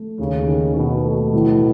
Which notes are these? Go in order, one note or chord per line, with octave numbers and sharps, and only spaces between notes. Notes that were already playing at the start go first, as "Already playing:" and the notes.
Already playing: A3
D#2 C#3
D#3
B2 D#4
A3
A2